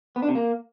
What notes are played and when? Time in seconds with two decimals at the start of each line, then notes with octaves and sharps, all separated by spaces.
0.16 B3
0.22 D4
0.29 C3
0.35 A#3